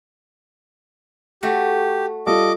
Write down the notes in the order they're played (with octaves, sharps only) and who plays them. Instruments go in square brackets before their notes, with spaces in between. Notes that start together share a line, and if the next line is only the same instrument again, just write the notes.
[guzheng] A3 F#4 [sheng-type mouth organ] G4
[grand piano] G3 F4 A4 [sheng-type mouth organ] D#5 D6